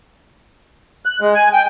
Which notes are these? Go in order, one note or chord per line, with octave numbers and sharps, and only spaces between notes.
F#6
G#3
G#5
G5